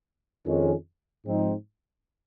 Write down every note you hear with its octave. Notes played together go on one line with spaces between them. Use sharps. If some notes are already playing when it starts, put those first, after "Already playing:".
F2 D#3 G#3 C#4
G#2 F3 C4 D#4